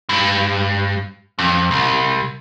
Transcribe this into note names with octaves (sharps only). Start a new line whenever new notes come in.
G2
F2
C2